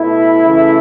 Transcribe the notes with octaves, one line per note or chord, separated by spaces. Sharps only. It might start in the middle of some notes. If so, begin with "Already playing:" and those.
Already playing: B2 A3 E4
C#3 E3 A3